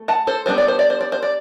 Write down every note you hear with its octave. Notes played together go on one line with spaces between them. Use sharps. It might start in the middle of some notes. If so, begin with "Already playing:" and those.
Already playing: A3
F#5 A5
A4 C5
G3 B3 D4 C5
D5
C5
D5
C5
D5
C5
D5